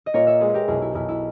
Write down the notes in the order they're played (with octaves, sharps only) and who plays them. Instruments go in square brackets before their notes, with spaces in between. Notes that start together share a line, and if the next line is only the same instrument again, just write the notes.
[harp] D#5
[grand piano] A#2 [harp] A#4 C#5
[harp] C#5 E5
[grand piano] G#3 [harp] G#4 B4
[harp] G4 A#4
[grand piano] B1 [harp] E4 G#4
[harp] E4
[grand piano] B1 [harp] E4
[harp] E4